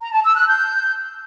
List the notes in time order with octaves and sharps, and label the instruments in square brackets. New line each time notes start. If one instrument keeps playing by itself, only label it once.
[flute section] A#5
A5
E6
F#6
G6